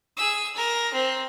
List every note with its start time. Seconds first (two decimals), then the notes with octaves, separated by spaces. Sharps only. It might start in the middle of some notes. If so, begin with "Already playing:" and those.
0.17 G#4 E6
0.56 A#4
0.93 C4